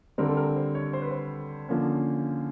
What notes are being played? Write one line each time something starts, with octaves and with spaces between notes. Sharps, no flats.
D3 G3 C4 A#4
A4
A#4
C5
C#5
C5
B4
C5
D3 F3 A#3 C#4